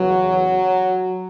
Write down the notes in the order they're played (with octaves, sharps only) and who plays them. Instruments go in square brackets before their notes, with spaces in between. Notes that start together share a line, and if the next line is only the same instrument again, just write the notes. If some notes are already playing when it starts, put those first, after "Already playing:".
Already playing: [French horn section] E2 C#3 E3 F#3